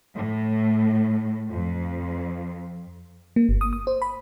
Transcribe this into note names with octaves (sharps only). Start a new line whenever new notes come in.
A2
F2
A#3
G1
D#6
D#6
C5
B5